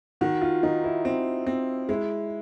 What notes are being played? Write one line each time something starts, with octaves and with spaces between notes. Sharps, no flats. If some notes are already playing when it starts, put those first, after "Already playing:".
D#3 F#4
F4
D#3 D#4
E4
C4
C4
G#3 E4